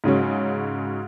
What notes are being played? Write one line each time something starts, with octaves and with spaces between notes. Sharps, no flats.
G#2 C#3 F#3 C#4